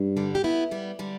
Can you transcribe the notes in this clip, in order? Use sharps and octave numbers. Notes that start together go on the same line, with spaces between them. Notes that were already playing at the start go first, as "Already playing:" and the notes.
Already playing: G2
D3 G3
G4
B3 E4
G3 B3
D3 G3